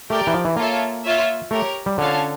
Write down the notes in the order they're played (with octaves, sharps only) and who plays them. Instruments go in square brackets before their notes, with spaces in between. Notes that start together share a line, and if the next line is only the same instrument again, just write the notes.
[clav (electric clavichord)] A3 [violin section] G4 A#4 D5 G5
[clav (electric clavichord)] E3
F3
E3
[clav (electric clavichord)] A#3 [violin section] F4 A4 C#5 E5
[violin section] F4 C#5 E5
[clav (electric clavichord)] A3 [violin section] G4 A#4 C#5
[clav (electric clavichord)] G3
[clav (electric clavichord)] D3 [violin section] C#4 F4 C#5 F5 A5